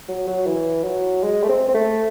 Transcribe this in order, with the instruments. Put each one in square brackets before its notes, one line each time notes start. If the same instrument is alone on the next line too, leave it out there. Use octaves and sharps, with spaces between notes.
[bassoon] F#3
F#3
E3
F#3
G#3
A3
C4
C4
A3